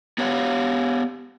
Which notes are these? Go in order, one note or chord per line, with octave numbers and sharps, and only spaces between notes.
B3 G4 C#5 F5 F#5